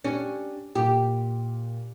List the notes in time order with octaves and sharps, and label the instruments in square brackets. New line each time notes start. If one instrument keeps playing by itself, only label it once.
[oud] C#4 [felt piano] D4 G4
[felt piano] A#2 [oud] G4